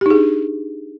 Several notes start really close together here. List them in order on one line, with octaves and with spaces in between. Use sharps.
G4 D#4 G#4 D4